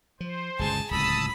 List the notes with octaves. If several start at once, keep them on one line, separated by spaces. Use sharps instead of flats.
F3 C5
G1 C#2 B2 G#4 A5
D1 C#2 A2 A5 B5 D#6 E6